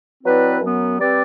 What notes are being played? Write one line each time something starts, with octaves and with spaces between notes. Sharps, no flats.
F#3 C4 E4 B4 D5
F#2 F#3 B3
G3 C4 G4 B4 D5